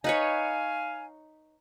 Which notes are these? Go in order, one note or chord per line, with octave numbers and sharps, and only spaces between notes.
D#4 B4 C#5 F5 G#5